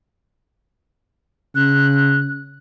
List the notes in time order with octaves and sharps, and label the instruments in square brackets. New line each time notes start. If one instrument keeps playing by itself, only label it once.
[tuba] C#3 [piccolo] F#6